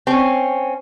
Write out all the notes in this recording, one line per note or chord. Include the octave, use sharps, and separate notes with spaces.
C4 C#4